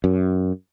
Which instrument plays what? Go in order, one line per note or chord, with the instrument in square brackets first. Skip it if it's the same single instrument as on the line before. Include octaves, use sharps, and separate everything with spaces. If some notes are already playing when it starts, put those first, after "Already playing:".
[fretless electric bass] F#2